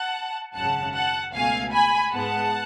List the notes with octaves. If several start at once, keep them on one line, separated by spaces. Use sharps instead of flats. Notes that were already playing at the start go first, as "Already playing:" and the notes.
Already playing: F#5 A5
G#1 F#2 C#3 F#5 A5
F#5 A5
C#2 B2 A3 F5 G#5
G#5 B5
G#2 G#3 B3 F#5 A5